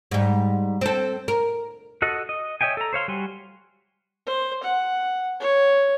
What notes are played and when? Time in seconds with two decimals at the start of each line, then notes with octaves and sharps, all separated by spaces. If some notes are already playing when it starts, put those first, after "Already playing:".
0.11 G#2 G3
0.81 C4 A4
1.28 A#4
2.02 F#4 A4 D#5 F#5
2.29 D#5
2.61 C#5 D#5 E5 G5 G#5
2.77 A4 A#5
2.93 C5 C#5 F5 C6
3.08 G3 F#4 G#5 C6
4.27 C5
4.64 F#5
5.40 C#5